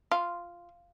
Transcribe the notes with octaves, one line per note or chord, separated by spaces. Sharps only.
F4